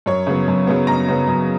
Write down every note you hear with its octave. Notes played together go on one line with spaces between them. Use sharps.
F#2 C#5
C#3 F#3 B3
F#2
C#3 F#3 B3
F#2 A#5
C#3 F#3 B3
F#2